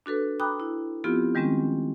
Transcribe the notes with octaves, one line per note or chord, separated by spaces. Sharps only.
D4 F#4 A4 B4
G5 A#5 B5 D6 D#6 F#6
E4
F3 B3 C4 E4 F4 G4
D#3 G3 G#3 C4 C#4